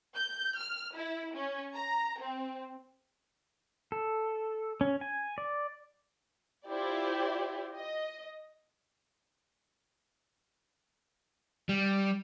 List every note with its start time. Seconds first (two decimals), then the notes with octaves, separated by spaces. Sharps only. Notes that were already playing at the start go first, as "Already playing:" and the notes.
0.16 G6
0.58 F6
0.97 E4
1.36 C#4
1.75 A#5
2.21 C4
3.92 A4
4.81 C#4
5.01 G#5
5.38 D5
6.68 E4 F4 G4 C5 D5
7.76 D#5
11.69 G3